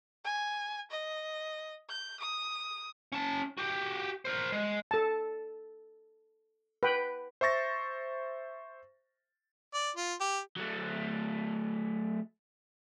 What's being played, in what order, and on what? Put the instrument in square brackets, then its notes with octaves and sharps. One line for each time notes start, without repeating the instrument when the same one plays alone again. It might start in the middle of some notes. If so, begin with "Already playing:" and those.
[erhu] G#5
D#5
G6
D#6
[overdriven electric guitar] C#4 A5
F#4 G4
A#4 C5
G#3
[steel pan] A4 A5
B4 G5
[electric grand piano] C5 E5 C#6 A6 A#6
[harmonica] D5
F4
G4
[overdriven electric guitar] F#3 A3